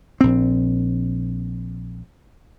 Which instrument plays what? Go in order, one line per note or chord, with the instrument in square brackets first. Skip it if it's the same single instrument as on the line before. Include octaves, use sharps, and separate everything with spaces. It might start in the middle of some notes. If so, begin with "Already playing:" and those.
[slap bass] A#1 C4